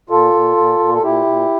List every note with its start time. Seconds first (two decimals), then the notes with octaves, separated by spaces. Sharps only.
0.09 A#2 F4 A4
0.34 A#2
0.57 A#2
0.79 A#2
0.94 A4
1.03 A#2 E4 G4
1.26 A#2